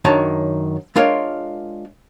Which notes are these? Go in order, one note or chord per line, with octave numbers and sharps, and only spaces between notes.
F#2 D#3 D4 C#5 A5 A#5
G#3 D4 F4 A#4 C#5 D5